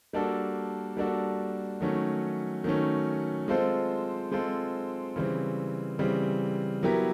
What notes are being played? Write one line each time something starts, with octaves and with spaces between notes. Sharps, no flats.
G3 A#3 D4 F#4 A4
G3 A#3 D4 F#4 A4
D#3 F#3 A3 C#4
D#3 F#3 A3 C#4
G#3 C4 F4 A4 C5
G#3 C4 F4 A4 C5
C#3 E3 G3 C4
C#3 E3 G3 C4
F#3 B3 E4 G4 A#4